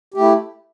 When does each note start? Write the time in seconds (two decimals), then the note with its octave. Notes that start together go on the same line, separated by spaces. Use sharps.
0.14 G4
0.17 A3
0.20 E4